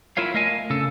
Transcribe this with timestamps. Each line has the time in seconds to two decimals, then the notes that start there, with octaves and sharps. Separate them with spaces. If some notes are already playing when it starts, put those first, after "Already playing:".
0.17 E4 F4 A#4 C#5 F5
0.34 A3 A#4 D#5 F5 G#5
0.70 C#3 A4